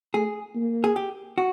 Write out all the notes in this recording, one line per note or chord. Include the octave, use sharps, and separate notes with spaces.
A3 G#4
A#3
G#4
G4
F#4